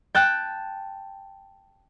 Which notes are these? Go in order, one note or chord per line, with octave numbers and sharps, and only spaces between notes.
G5 A5 F#6